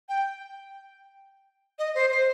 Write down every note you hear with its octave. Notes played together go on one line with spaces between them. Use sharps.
G5
D#5
C5
C5